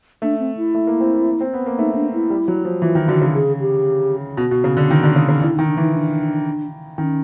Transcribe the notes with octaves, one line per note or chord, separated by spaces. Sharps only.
A3 D4
C4
E4
A3
A#3
C4
A#3
C4
B3
A#3
A3 D#4
D4
E4
G3
F#3
F3
E3 F4
D#3
D3 F#4
C#3
G#4
G4
B2 F#4
B2
C#3
D3
D#3
D3
C#3
C#3
D3 E4
D#3 D#4
D4
E3 D#4
D4
D#3 C#4